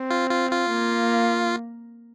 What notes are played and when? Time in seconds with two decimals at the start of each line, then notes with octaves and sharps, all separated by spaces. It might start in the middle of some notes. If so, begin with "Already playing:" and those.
Already playing: C4
0.11 F4
0.30 F4
0.51 F4
0.70 A#3